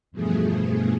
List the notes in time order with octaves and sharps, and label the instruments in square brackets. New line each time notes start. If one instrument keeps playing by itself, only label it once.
[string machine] E2 G2 B2 F3 A3 G#4